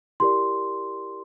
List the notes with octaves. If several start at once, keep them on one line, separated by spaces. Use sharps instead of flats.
E4 G4 A#4 D5 C6